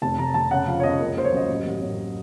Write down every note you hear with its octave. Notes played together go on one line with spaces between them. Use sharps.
F1 A5
F1 A#5
F1 A5
C#3 F#5
F3 F5
C#5
C#2 D#5
F#1 A#4
A#3 C5
C#5
F#2 D#5
A1
A1
A1